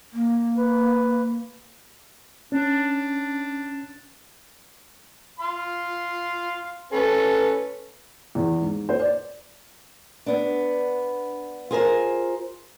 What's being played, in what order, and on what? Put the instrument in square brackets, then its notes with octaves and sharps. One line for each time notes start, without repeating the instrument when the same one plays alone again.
[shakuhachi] A#3
[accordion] B4
[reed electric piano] C#4 [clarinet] D4
[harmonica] F5 C6
C#4 A4 B4
[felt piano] E2
G#2
C5
D5
[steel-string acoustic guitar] B3 D4
F4 G#4 A#4 C5